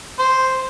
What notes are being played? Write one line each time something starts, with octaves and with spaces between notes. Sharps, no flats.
C5